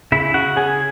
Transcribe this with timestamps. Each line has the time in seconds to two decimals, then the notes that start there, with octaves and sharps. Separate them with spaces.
0.12 C#3 E4 E5
0.34 C#3 F#4 F#5
0.56 C#4 G#4 G#5